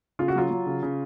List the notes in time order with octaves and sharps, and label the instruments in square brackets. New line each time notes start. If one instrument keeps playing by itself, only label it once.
[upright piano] C#3 F4
F#4
F#3 F4
F#3
C#3
C#3